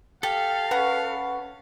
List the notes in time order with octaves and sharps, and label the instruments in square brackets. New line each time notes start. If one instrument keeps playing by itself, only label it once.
[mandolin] G4 [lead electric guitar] A4 [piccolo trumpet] F5
[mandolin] C#4 [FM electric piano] B4 F#5 B5